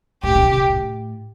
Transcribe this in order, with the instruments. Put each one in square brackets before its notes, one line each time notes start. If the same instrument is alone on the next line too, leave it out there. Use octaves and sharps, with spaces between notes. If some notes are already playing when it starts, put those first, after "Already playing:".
[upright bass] A2 [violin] G4
[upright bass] A#2
B2
A#2
A2